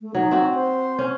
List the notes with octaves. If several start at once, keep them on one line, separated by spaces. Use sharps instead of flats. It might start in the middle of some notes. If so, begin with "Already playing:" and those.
A3
F#3 D#4
C4 F#4
C5
C#4